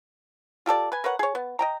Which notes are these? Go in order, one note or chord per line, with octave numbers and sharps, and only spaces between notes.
F4 G4 A4 D5
B4 G#5
A#4 B4 C#5 F#5
G#4 C#5
B3
D#5 G5 A#5